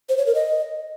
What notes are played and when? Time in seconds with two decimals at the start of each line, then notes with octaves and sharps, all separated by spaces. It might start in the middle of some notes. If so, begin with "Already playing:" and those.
0.09 C5
0.18 C#5
0.26 A#4
0.35 D#5